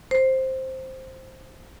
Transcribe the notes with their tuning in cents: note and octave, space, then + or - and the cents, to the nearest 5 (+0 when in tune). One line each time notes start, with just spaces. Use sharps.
C5 +5